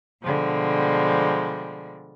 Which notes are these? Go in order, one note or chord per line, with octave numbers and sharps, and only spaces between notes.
B2 D3 F3 G3 G#3